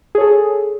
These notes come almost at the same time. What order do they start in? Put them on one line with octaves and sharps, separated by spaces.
G#4 C#5 A4